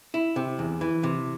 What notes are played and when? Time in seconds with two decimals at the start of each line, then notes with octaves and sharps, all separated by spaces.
0.14 E4
0.36 C3
0.59 E2
0.81 E3
1.03 C3